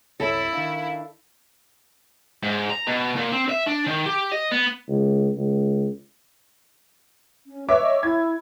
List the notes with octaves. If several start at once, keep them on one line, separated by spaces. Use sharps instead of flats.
C2 F#2 E4 A4 C#5
D#3 D4 F5
G#2
A#5
B2
A#2
C4
E5
D4
D#3
G4
D#5
B3
C#2
C#2
C#4
B4 C#5 E5 D6
D#5
E4 G#6